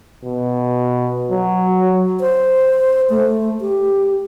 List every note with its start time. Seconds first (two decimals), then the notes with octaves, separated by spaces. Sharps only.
0.24 B2
1.31 F#3
2.20 C5
3.10 A3
3.61 G4